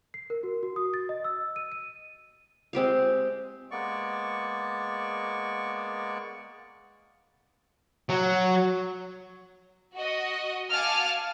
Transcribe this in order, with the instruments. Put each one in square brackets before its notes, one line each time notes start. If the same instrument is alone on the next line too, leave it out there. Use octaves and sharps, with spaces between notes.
[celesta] C7
A#4
F#4
F#4
D#6
A6
D#5
E6
D#7
D#7
[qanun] G#3 C4 G4 F5
[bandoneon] G#3 A#3 B3 D5 C#6
[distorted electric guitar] F#3
[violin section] F#4 D#5
F5 F#5 G#5 A5 D6 F6